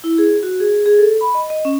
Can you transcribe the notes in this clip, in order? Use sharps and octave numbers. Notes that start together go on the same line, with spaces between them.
E4
G#4
F#4
G#4
G#4
A4
B5
D#5
D#5
C#4